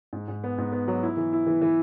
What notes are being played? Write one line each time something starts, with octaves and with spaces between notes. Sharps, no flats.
G#2
G#2
B3
G#2
B3
F#3
E4
E3
E4
E3
E3